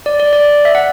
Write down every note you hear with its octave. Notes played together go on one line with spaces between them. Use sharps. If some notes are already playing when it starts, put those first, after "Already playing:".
D5
D5
D5
E5
F#5